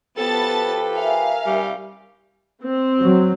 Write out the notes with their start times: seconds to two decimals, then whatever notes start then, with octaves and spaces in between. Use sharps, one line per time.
0.18 F3 B3 G4 A4 B4 A5 A6
0.96 A#4 E5 F5 G#5
1.46 G3
2.62 C4
3.00 F#3